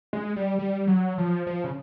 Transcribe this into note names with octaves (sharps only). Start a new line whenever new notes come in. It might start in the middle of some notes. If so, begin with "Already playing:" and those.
G#3
G3
G3
F#3
F3
F3
C#3